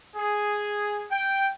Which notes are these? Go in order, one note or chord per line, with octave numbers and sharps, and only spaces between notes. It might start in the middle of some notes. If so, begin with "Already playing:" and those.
G#4
G5